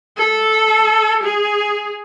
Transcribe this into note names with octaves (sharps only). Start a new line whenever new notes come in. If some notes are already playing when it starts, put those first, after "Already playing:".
A4
G#4